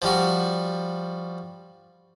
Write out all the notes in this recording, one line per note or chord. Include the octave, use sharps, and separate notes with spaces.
F3 G3 F#4